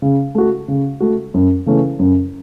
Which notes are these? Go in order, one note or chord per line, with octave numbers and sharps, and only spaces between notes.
C#3
A3 F#4
C#3
A3 F#4
F#2
C#3 E3 A3 C#4
F#2